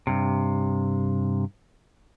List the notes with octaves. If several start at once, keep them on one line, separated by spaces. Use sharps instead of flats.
G2 C3